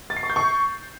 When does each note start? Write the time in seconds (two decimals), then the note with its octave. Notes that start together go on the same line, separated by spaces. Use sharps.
0.10 A6
0.17 C7
0.23 C#6
0.30 G6
0.36 C#6